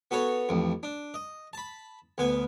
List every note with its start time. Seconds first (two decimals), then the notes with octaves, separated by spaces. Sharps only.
0.11 B3 F#4 A4 C#5
0.49 A1 F2
0.83 D4
1.14 D#5
1.53 A5 B5
2.18 D2 B3 G#5